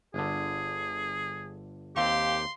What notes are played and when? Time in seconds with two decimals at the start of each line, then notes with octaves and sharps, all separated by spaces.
0.14 G1 D3 G#4
1.97 D#2 C4 G4 F5 C6